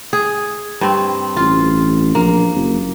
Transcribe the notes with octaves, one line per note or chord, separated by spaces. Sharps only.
G#4
G2 C4
A1 F4
A#1 A#3
F#1